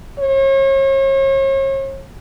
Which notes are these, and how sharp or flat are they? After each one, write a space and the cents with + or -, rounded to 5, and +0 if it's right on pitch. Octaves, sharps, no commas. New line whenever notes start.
C#5 -40